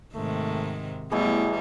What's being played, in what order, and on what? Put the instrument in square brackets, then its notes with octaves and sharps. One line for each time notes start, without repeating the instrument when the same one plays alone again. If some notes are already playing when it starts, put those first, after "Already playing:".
[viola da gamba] G#2 C3 D#3 [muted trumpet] A3
[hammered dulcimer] B2 E3 F#3 [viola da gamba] G3 [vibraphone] A3 B3 E4 [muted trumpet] G#4